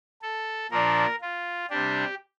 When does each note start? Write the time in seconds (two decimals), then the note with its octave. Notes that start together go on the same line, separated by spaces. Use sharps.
0.22 A4
0.71 A#2 F3 A#3 D4 A#4
1.21 F4
1.70 C3 G3 D4 G4